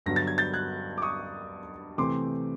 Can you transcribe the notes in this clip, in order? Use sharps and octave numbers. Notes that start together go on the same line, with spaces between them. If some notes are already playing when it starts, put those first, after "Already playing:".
G2 D3 F#3 B3 A#6
A6
G#6
G6 A6
F#6 G#6
D6
C#6 D#6
C3 E3 A3 C4 C6 D6